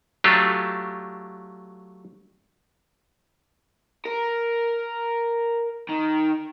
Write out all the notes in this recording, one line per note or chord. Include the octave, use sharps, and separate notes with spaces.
F#3 A3 D4 F4 G4
A#4
D#3